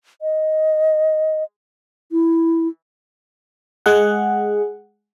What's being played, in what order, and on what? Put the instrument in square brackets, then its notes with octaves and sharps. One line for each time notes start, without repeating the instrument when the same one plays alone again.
[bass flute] D#5
E4
[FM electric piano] G#3 G#4 F#5